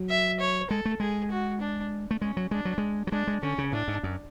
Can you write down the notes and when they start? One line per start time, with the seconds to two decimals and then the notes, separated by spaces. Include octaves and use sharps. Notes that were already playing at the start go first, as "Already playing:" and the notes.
Already playing: F#3
0.10 E5
0.40 C#5
0.70 G#3 A4
0.85 A3
1.00 G#3 G#4
1.31 F#4
1.61 D4
2.11 A3
2.22 G#3 C#4
2.37 F#3
2.51 G#3 D4
2.65 F#3
2.78 G#3
3.07 F#3
3.12 G#3 D4
3.27 G#3
3.43 D3 C#4
3.58 C#3
3.72 A2 D4
3.88 G#2
4.03 F#2